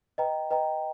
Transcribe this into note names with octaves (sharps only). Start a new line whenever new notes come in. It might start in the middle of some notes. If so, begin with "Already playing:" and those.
B4 D#5 G5 A#5
B4 D#5 G5 A#5